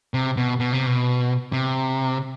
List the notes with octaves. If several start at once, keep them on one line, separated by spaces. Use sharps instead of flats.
C3
B2
B2
C3
B2
C3